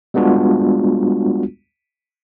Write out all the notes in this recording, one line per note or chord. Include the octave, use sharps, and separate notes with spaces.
G3 G#3 B3 D4 F4 F#4